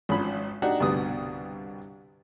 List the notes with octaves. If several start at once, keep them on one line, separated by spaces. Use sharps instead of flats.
G#1 G#2 F3 C#4 B5
D4 D#4 F#4 G4 F#5
C2 G2 B2 D3 B3 D#6